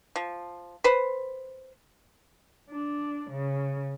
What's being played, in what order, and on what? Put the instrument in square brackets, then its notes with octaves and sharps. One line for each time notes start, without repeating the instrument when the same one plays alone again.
[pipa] F3
B4 C5
[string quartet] D4
C#3